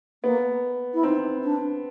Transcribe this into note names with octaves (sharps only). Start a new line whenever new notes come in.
A#3 B3
E4
C4 D#4
D4